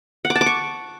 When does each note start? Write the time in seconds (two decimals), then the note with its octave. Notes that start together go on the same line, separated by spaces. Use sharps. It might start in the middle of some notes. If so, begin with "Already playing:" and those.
0.25 F#5
0.30 D6
0.36 A5
0.41 D6
0.46 C#6